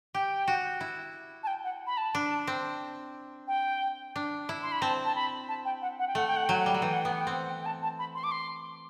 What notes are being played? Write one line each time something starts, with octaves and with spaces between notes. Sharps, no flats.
G4 G5
F#4
E4
A5
G5
F#5
B5
A5
D4
C4
G5
D4
E4
C6
B5
C4 A5
A5
B5
A5
G5
F#5
F#5
G5
A3 F#5
G5
F#5
F#3 G5
F#5
G3 G5
F#3 F#5
E3 G5
F#5
B3 G5
F#5
G5
C4 F#5
G5
G5
A5
A5
B5
C6
D6
C6